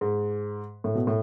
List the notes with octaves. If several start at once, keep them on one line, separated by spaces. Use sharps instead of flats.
G#2
A2
B2
A2